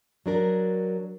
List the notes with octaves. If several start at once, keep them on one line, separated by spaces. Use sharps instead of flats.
F#3 D4 A#4